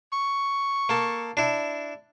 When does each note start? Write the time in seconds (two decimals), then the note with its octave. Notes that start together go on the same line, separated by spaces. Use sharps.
0.13 C#6
0.89 A#3 A4
1.37 D4 E4